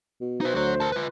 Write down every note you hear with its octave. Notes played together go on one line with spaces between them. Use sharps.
B2
D#4 B4 C5
D2 F#4 C#5
A#4 A5
F4 B4